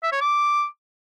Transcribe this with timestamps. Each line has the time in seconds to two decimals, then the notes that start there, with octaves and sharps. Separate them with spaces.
0.03 E5
0.12 C#5
0.21 D6